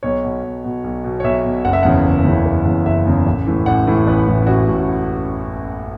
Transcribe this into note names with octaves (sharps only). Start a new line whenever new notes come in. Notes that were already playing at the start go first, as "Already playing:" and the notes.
B1 C#5
B2
B1
B2
B1
B2
C#5
B1 E5
B2
F#1 F#5
E5
E2 C#3 E3 F#5
F#1
E2 C#3 E3
F#1
E2 C#3 E3
F#1 E5
E2 C#3 E3
A1
A2 E3
A1 F#5
A2 E3
A1 B4
A2 E3
E4
A1 F#4
A2